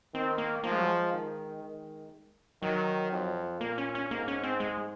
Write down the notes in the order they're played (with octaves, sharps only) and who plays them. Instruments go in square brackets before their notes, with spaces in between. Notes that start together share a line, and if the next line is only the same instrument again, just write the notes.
[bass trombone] D#3 [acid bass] C4
[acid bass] A#3
[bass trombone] F3 [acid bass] A#3
[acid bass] G#3
F#3
G#3
[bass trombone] D#3
D#3
[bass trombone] D#3 [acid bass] F#3
[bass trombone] F2
[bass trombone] A#2 [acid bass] A#3
[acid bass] C#4
C#4
[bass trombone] G#2 [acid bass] A#3
[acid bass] C#4
C4
G#3